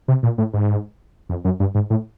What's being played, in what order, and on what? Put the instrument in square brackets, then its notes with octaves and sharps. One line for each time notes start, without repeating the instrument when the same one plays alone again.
[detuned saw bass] C3
A#2
A2
G#2
F2
F#2
G2
G#2
A2